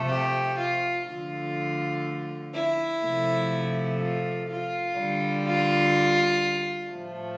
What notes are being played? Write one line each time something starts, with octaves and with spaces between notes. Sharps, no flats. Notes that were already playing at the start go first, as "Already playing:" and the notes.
Already playing: C3 F3 A3
G4
F4
D3 F3 A3 F4
E4
C3 F3 A3
F4
F4
D3 G3
F4
A2 F3 A3